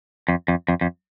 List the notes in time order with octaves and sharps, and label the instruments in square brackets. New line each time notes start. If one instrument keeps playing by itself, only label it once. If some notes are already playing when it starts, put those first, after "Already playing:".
[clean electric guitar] F2
F2
F2
F2